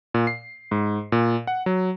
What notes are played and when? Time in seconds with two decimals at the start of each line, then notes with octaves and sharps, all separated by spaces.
0.14 A#2
0.27 C7
0.71 G#2
1.12 A#2
1.47 F#5
1.66 F#3